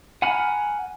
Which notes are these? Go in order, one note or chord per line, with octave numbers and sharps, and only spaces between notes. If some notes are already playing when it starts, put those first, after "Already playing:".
F#5 G#5 A#5 B5 F6